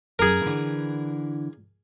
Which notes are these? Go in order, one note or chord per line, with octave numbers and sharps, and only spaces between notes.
F#2 G#4 A#4
D3 E3